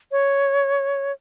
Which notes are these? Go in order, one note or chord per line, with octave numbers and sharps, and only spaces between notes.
C#5